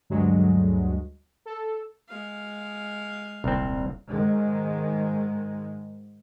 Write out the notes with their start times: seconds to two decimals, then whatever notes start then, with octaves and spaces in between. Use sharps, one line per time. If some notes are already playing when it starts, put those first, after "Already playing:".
0.10 D2 G2 F#3 G#3
1.46 A4
2.09 G#3 F5
3.44 D#1 C2 C4
4.08 G#2 D#3 G#3